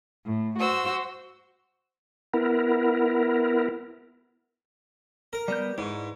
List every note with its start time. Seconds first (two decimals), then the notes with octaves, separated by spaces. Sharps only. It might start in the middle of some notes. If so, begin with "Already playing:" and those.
0.24 A2
0.57 F#4 C5 E6
2.34 B3 E4 A#4
5.33 A#4
5.48 G3 B3 D5 G6
5.78 G#2 E4 B4 C#6